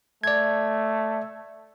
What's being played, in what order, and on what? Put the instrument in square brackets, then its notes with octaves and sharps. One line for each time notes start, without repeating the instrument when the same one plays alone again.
[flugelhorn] A3 [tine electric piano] D5 G#6